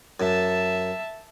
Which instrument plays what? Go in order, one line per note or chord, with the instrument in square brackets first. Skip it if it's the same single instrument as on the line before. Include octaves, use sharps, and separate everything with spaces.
[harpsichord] F#2 [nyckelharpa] E5 A5